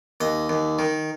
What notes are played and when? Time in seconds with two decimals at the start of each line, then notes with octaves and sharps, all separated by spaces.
0.21 D#2 D#5
0.49 D#2
0.79 D#3